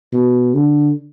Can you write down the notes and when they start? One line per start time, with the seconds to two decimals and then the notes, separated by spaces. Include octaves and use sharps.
0.13 B2
0.54 D3